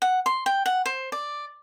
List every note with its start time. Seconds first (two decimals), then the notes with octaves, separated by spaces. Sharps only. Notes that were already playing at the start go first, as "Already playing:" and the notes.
0.02 F#5
0.26 C6
0.46 G5
0.66 F#5
0.86 C5
1.12 D5